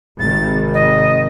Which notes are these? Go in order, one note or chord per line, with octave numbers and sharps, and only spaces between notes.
G#1 C3 D#3 A6
D#5